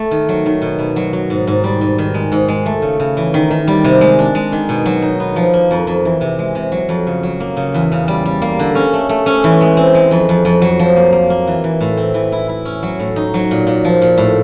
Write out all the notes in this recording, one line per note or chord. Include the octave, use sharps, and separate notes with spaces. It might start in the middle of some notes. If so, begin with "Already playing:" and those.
Already playing: A3
D#3
F#3
D#3
B2
B2
F#3
F#3
G#2
G#2
G3
G#2
D#3
G#3
G#2
G#3
A3
C#3
C#3
E3
D#3
D#3
G3
C3
G#3
D4
G#3
D#3
B2
F#3
D#4
B3
F3
A#3
F2
F2
E3
C3
G#3
C3
F#3
F2
C#3
F#3
A#3
C#3
E2
C#3
G3
G3
A#3
D3
C#4
A3
A3
C#4
E3
G#3
C4
G#3
F2
F2
F2
F#3
F3
A#3
A#3
A#3
E3
E3
A2
C4
E3
E4
E4
C#4
F#3
A2
D#4
F#3
A#2
A#2
F3
A#2
A2